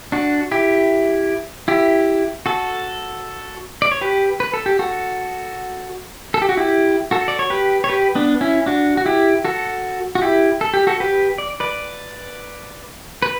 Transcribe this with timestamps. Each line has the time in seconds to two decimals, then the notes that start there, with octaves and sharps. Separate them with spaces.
0.12 D4 F#4
0.51 E4 G4
1.68 E4 G4
2.46 F#4 A4
3.82 D5
3.91 C#5
4.01 G4 B4
4.40 B4
4.54 A4
4.66 G4
4.79 F#4 A4
6.34 A4
6.42 G4
6.49 F#4
6.57 E4 G4
7.11 F#4 A4
7.28 D5
7.39 C#5
7.50 G4 B4
7.84 C#5
7.89 G4 B4
8.15 B3 D4
8.41 C#4 E4
8.66 D4 F#4
8.97 F#4
9.06 E4 G4
9.45 F#4 A4
10.15 F#4
10.22 E4 G4
10.61 A4
10.74 G4
10.87 F#4 A4
11.00 G4 B4
11.38 D5
11.60 B4 D5
13.22 B4